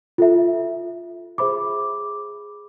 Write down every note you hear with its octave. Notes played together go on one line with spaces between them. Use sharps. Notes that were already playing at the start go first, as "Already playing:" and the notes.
F4 A4 E5
G#4 C5 E5 B5 D6